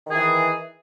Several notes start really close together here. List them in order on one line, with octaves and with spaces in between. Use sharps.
D#3 G#4 E3